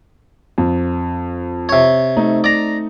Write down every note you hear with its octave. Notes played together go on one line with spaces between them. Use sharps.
F2
C3 C#5
A3 C4 D#4
D5 A#5